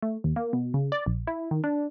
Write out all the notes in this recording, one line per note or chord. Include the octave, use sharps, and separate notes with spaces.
A3
D#2
A#3
B2
C#3
D5
A#1
E4
D#3
D4